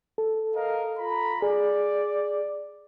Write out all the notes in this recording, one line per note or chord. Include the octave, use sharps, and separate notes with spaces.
A4
A#4 D#5 F5
F4 A#5 B5
G#4 D5